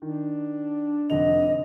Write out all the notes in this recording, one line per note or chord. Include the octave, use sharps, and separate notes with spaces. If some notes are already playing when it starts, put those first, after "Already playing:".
D#3 D4
F1 D3 D#5 F7